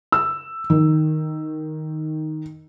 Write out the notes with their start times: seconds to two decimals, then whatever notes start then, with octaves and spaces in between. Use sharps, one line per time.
0.12 E6
0.70 D#3